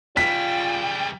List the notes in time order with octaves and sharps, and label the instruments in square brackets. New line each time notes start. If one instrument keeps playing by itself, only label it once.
[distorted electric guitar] C#3 G3 [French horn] F4 [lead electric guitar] G5 [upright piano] B6